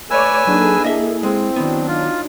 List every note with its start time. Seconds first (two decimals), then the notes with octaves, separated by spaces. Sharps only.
0.10 A3 B4 C#5 D5 G#5 E6
0.47 F#3 A#3 D4 D#4 G#4 A4
0.84 E4 D#5 E5
1.23 G#3 C4
1.56 D#3 F#3 B3 D4
1.88 D#4 F4